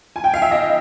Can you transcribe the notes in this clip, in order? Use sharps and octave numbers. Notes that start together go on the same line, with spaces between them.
G#5
G5
F5
E5
D#5